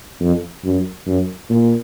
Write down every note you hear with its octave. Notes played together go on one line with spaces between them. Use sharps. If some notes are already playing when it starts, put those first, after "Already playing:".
F2
F#2
F#2
A#2